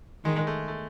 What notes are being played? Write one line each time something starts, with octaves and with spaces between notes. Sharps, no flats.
D#3 G#3
G#3
A3
A3